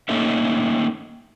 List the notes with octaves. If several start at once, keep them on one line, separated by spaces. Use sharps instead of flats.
A3 A#3 C#4 D#4 A4 E5